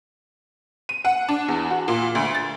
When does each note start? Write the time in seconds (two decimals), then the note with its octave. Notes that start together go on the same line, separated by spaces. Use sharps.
0.89 D#7
1.05 F#5
1.28 D4
1.48 E2
1.70 F#4
1.88 A#2
2.15 D2
2.35 A6